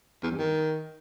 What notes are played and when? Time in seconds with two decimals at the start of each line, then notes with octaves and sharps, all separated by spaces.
0.23 E2
0.31 G2
0.39 D#3